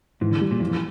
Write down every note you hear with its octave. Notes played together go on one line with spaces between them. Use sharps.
G#2 E3
D3
G3
A#2
F2 E3